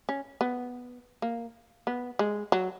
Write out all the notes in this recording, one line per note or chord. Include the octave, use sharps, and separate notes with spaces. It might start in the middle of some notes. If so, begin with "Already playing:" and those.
C#4
B3
A#3
B3
G#3
F#3